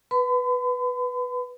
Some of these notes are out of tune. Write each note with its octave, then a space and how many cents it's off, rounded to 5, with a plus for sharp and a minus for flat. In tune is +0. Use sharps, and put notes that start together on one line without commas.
B4 +0 B5 +45